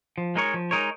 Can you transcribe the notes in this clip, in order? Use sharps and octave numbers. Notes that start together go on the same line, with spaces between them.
F3
G#3 D#4 A#4 C#5
F3
G#3 D#4 A#4 C#5